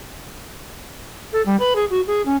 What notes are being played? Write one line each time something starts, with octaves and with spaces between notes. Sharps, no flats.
A4
G3
B4
G#4
F#4
G#4
C#4